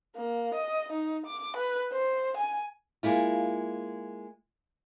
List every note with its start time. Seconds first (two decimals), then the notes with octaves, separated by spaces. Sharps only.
0.16 A#3
0.54 D#5
0.92 D#4
1.26 D6
1.56 B4
1.92 C5
2.37 G#5
3.03 G#3 A#3 E4 F4